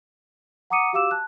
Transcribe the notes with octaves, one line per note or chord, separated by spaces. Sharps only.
F#5 A#5 D6 D#6 C#7 D#7
F#4 G4 F5 D6 E6 E7
A5 F#6